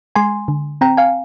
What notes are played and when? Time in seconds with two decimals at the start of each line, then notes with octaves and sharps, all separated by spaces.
0.16 G#3 G#5 C6
0.48 D3
0.81 C4 G5 A#5
0.97 F5 G#5